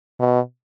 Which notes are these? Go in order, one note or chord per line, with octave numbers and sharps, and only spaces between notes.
B2